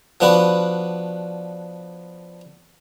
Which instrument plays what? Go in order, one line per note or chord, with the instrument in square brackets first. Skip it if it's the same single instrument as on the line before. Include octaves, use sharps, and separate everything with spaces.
[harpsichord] F3 B3 D4 F#4 B4